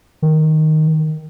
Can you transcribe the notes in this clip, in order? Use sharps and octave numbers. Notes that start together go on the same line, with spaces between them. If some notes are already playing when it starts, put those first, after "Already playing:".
D#3